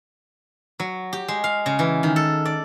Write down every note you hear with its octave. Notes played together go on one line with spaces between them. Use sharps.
F#3
G4
G#3
F5
C#3
E3
D#3
A4
D5